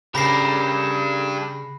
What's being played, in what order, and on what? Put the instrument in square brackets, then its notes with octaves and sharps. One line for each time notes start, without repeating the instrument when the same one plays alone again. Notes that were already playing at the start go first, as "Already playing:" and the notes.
[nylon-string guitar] C#3 [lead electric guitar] D4 G4 [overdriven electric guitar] A4 A#4 [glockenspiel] B5 A#6 C7